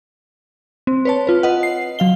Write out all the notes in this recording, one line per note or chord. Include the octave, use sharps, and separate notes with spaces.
C4
B4 C#5 A5
F4 B4
B4 D#5 F#5
C7
F#3 F5 G7